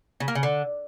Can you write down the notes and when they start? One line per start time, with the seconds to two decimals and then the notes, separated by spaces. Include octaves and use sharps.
0.20 C#3
0.28 A#3
0.35 C#3
0.43 D3